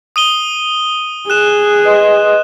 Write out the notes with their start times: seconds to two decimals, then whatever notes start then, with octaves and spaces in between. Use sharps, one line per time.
0.16 D#6 D#7 G7
1.30 G#4 F#6 E7
1.83 B4 D#5 C6